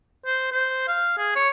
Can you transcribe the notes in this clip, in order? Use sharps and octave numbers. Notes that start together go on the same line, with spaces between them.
C5
C5
F5
G#4
C#5